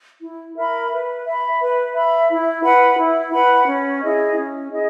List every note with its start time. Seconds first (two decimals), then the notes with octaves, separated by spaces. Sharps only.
0.21 E4
0.55 A#4 E5 B5
0.91 B4
1.25 E5
1.30 B5
1.59 B4
1.94 E5 B5
2.29 E4
2.63 B4 F#5 B5
2.98 E4
3.32 B4 F#5 B5
3.68 C#4
4.02 E4 G#4 D#5
4.37 C#4
4.71 E4 G#4 D#5